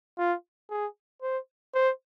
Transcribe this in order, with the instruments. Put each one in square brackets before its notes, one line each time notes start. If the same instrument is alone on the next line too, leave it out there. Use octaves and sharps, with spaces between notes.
[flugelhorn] F4
G#4
C5
C5